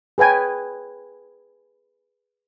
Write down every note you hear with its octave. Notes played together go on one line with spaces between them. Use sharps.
G#4 B4 G5 G#5